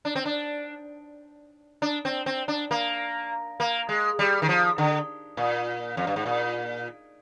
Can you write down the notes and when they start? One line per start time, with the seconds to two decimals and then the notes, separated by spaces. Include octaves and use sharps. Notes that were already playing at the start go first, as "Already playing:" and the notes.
0.05 D4
0.15 C4
0.25 D4
1.82 D4
2.05 C4
2.26 C4
2.48 D4
2.71 A#3
3.60 A#3
3.89 G#3
4.19 G3
4.42 D#3
4.49 F3
4.78 D3
5.37 A#2
5.97 F2
6.07 G2
6.16 G#2
6.26 A#2